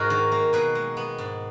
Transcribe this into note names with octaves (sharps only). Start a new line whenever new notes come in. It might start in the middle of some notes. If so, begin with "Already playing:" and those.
Already playing: G#2 G#3 F#4 G#4 A#4
D#3
A#3
B2 G#4 B4
G#3
B3
G#2